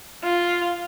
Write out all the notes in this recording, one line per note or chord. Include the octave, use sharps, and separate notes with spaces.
F4